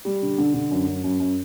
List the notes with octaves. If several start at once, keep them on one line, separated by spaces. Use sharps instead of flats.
G3
D3
D3
D3
F#2
F#2
F#2
F#2